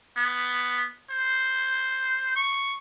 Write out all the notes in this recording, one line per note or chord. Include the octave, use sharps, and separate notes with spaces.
B3
C5
C#6